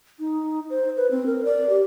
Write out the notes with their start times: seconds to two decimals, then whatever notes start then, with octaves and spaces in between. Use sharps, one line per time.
0.19 D#4
0.70 C5
0.97 B4
1.11 C4
1.26 A#4
1.45 D5
1.70 G4